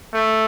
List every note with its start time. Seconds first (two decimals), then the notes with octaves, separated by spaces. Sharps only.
0.13 A3